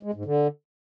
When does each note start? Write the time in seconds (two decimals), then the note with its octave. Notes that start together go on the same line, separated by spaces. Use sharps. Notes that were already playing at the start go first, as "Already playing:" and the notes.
0.03 G#3
0.14 G#2
0.25 D3